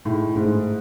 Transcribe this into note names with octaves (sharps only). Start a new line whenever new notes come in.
A2 A3 D#4 G#4
G#2 A3 D#4 G#4